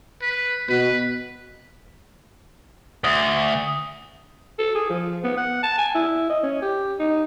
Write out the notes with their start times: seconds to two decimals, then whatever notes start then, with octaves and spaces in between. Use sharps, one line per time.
0.22 B4
0.69 B2 B4
3.04 D2 D#6
4.59 A4
4.75 G#4
4.90 F3
5.24 B3
5.37 F#5
5.63 A5
5.78 G#5
5.95 E4
6.30 D#5
6.43 C#4
6.62 G4
6.99 D#4